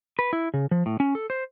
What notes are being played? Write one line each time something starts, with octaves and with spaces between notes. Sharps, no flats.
B4
E4
C#3
F3
A2
C#4
A4
C5